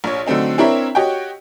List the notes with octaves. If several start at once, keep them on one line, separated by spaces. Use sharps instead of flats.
A#1 C#5
D3 F#3 A3 C4 D#4
C4 D4 E4 A#4 C#5 E5
F#4 G4 C#5 D#5 G5